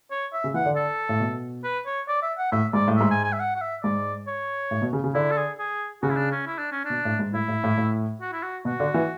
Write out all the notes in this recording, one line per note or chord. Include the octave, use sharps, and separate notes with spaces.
C#5
E5
C#3
E3 F#5
D3
A4
A2
B2
B4
C#5
D5
E5
F#5
A2 E5
G#2 D5
A2
G#2 E5
G#5
G#5
E5
F#5
F#5
E5
G#2 D5
C#5
A2
B2
C#3
C#3
D3 E4
A4
G#4
G#4
C#3 F#4
E4
D4
C#4
E4
D4
C#4
D4
B2
A2
G#2
A2 E4
A2
A2
A2
F#4
E4
F#4
B2 F#4
D3
E3